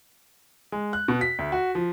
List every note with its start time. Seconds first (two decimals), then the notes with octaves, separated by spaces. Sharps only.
0.72 G#3
0.93 F#6
1.08 B2
1.21 B6
1.39 D2
1.52 F#4
1.75 F3